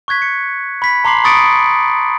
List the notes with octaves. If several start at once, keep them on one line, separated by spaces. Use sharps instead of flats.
C#6 F#6 G#6 B6
C#7
B5 B6
A5 A#5 C6 D6 C7 F#7
B5 C#6 D#6 A6 C#7 D7